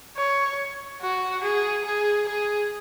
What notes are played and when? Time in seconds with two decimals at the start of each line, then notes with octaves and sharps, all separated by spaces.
0.17 C#5
1.02 F#4
1.44 G#4
1.86 G#4
2.28 G#4